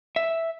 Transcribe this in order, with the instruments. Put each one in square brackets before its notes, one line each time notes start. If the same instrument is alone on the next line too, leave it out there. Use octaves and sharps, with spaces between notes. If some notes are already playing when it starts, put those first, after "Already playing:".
[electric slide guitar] E5